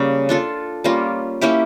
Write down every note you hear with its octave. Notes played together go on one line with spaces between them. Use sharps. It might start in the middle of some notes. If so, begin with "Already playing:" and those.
Already playing: C#3 G3 A#3 C#4
D4 F4 A4
G3 A#3 C#4 F4
A#3 C#4 E4 G4